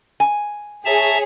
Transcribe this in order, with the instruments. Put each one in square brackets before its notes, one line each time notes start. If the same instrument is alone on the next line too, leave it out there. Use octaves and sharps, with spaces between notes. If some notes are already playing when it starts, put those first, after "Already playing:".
[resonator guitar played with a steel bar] G#5
[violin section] G#4 C#5 [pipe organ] E5 A5 A#5